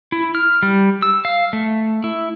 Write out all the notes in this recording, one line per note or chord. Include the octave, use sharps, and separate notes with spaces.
E4
F6
G3
E6
F5
A3
E4